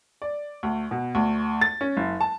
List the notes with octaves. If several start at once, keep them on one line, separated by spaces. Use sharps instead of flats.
D5
D2
B2
D2
A6
C#4
F#1
A5